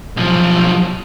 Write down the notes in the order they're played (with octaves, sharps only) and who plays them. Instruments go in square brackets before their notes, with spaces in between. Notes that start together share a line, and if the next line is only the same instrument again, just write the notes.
[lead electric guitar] B1 F3